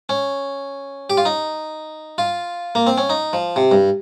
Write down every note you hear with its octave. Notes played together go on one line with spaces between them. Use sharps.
C#4
G4
F4
D#4
F4
A#3
C4
C#4
D#4
F3
C3
G2